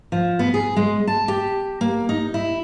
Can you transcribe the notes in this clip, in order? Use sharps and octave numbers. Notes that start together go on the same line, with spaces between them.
F3
B3
G#4
G#3
A5
G4
A#3
D#4
E4